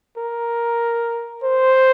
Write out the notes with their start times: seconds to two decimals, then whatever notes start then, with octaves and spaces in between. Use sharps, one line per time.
0.17 A#4
1.43 C5